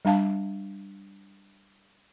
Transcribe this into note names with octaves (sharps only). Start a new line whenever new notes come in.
G3 D4 F5 A5